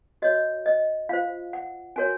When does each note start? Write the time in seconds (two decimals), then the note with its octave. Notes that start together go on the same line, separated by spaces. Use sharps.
0.22 F#4 C#5 D#5
0.66 D#5
1.09 F4 C5 F5
1.53 F#5
1.96 C#4 F#4 A#4 C#5 G#5